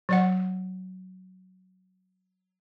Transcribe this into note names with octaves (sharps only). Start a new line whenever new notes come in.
F#3 D5 F#5